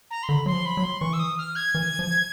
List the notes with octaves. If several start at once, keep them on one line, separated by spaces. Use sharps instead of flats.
A#5
C6
D3 B5
F#3 C6
F3
B5
F#3
C6
E3 C#6
E6
D#6
F6
G#6
E3
F3